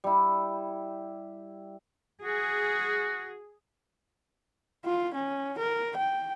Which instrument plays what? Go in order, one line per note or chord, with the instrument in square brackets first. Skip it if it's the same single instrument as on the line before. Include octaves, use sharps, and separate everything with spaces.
[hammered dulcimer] G3 E4
[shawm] F#4 [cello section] G#4
[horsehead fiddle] F4
C#4
A#4
G5